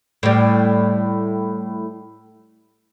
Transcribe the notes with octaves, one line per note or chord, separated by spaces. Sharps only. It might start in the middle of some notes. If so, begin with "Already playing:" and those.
A2 G3